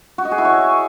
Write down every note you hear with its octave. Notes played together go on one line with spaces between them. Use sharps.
F#4
D#5
G#4
E4
C#5